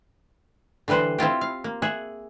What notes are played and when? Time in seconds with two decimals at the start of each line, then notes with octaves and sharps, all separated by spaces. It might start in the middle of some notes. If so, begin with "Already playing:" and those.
0.88 D3 E3 G3 B4 C5
1.18 C4 E4 F4 G4
1.41 F5
1.64 A#3
1.82 G#4 E5 F#5